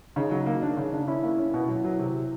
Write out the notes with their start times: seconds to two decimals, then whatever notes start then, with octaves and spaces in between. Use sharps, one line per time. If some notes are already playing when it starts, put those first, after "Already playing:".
0.16 C#3 D#4
0.31 F#3
0.46 A#3
0.62 D4
0.77 C#3
0.93 D4
1.08 C#4 E4
1.23 A#3
1.38 C#4
1.54 B2
1.68 F#3
1.84 F#3
1.99 C3